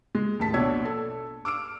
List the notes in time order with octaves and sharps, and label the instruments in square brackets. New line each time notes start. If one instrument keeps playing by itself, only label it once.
[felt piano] G#3
D#2 A2 A5 B6
A#1 B2 D4 C#5 E6 G#6
A4
D6 E6 F6 D7